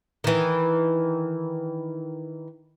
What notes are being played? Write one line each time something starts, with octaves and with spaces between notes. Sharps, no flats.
D#3 E3